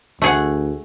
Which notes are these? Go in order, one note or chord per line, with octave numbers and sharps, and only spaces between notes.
D2 A3 G#4 F#5